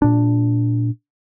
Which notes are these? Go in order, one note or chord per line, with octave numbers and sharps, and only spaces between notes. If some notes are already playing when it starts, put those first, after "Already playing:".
A#2 D4